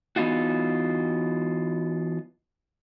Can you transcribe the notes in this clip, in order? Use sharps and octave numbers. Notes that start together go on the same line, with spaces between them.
E3 B3 D#4 F4 F#4